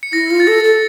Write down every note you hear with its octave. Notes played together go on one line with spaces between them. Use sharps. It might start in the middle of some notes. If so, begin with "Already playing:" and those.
C#7
E4 A#6
F4
A6
A4 A#6
A4